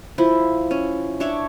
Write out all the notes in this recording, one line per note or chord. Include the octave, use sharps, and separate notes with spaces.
F3 E4
C#4
D4 C#5 E5